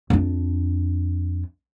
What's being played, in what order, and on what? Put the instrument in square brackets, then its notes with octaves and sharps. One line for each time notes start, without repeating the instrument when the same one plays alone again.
[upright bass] F2 D4